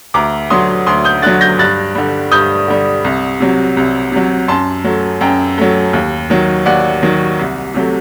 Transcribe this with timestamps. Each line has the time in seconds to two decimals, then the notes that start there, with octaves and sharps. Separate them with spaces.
0.14 D2 A#5 D6
0.50 D3 F#3 C6 D#6
0.86 D2 C6 D#6
1.05 D#6 G6
1.22 D3 F#3 F#6 A6
1.41 G6 A#6
1.59 G2 F#6 A6
1.95 D3 G3
2.32 G2 D#6 G6
2.68 D3 G3
3.04 C2
3.40 C3 F#3
3.77 C2
4.12 C3 F#3
4.48 F#2 A5 C6
4.84 F#3 A3
5.21 F#2 G5 A#5
5.58 F#3 A3
5.93 D#2
6.30 D#3 F#3
6.66 D#2 D5 F#5
7.03 D#3 F#3
7.39 C2
7.74 C3 F#3 A3